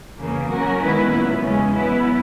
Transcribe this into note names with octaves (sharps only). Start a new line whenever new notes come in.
E2 C#3 E3 A#3
F#3 C#4 F#4 A#4
D#3 G#3 B3 E4 B4
A#2 F#3 B3
E2 C#3 G#3 C#4
F#3 B3 E4 B4